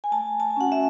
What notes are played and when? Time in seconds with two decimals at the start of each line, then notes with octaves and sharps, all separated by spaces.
0.04 G#5
0.12 A3 A5
0.40 A5
0.50 G#5
0.57 C#4 F#4 F#5
0.72 E5